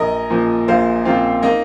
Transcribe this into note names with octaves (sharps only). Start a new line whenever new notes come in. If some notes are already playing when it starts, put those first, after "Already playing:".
Already playing: A#1 A#4 D#5
A#2 F3
A#1 C5 F5
A#2 F3 C4 F4
A#3 D#4